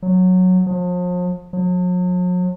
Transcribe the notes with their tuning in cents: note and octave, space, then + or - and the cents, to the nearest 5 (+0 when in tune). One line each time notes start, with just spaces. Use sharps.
F#3 -10
F3 +40
F#3 -45